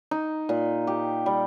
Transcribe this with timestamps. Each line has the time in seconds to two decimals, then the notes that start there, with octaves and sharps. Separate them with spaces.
0.11 D#4
0.49 A#2
0.87 G4
1.26 G3